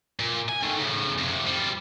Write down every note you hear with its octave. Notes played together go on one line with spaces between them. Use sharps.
A#2
G#5
D#3 A3
A2 C#3
F2 C3
G3 F4